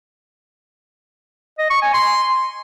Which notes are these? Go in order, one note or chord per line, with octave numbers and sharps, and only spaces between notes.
D#5
C#6
G#5
C6